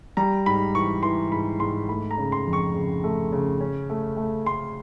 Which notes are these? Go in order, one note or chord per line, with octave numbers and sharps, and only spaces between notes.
G3 A#5
G#2 B5
E3 C#6
E3 C6
G#2 B5
G#2 C6
A3 B5
A#5
C#3
C6
F2
C#6
C#3
A3
C#3
C#4
A3
A3
A3 C6